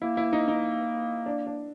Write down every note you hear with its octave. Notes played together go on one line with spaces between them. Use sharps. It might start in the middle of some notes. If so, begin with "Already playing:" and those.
A#3 E4
E4
D#4
D#4
D4
D4